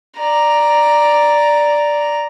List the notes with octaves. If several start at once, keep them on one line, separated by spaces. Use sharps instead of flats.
D5 A#5